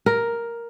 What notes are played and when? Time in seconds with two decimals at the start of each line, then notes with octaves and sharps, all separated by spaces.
0.06 A#4